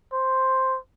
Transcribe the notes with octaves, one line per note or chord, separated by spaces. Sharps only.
C5